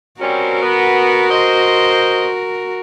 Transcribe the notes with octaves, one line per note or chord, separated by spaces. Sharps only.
G3 C4 C#4 F#4 A#4
B3
C5 D#5